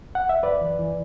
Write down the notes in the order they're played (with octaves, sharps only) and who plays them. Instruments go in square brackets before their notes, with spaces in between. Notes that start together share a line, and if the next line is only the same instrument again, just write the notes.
[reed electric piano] F#5
E5
F#2 B4 D5
E3
E3